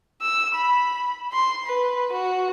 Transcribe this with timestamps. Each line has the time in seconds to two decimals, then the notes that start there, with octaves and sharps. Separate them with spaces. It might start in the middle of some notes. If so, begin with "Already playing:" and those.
0.22 E6
0.55 B5
1.32 C6
1.66 B4
2.12 F#4